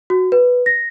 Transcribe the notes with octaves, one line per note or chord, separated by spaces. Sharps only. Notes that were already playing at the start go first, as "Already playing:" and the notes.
F#4
B4
A#6